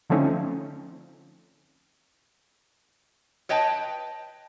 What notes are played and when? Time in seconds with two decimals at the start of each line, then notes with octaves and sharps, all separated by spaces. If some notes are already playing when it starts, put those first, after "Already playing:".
0.10 D3 F3 A3 C4 C#4 D#4
3.49 B4 C#5 D#5 G5 A5